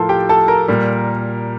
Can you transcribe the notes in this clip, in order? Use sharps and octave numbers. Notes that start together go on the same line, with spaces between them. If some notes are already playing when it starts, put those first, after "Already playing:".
Already playing: A2 F3 A4 A#4 A5 C6
G4 G5
A4 A5
A#4 A#5
A#2 G3